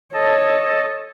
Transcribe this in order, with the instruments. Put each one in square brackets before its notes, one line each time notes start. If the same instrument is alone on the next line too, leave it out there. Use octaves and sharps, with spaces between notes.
[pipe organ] A4 D#5 A5 [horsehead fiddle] C#5